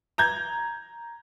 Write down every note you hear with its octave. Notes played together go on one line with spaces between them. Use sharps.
A#5 G6 G#6